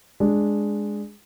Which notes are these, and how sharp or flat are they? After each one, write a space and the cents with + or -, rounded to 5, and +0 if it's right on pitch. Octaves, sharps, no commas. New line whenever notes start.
G#3 +0 D4 +0